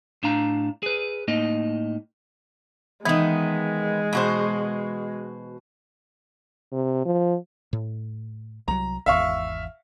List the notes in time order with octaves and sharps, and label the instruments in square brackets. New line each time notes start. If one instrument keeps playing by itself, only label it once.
[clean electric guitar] A2 D4 F5 A#5
G#4 B4
A2 A#3 D#4 D#5
[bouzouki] D#3 B3 [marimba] E3 D#4 [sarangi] G#3
[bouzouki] B2 F#4 C5
[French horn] C3
F3
[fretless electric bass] A2
[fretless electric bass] C2 F#3 [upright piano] A#5
[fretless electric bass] G#1 E2 [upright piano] E5 F5 C#6